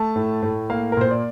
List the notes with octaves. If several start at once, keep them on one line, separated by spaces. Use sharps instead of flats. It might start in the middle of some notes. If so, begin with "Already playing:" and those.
Already playing: A3 A5
A2
A2
A#3 F5
A#4
A#2 C5
D5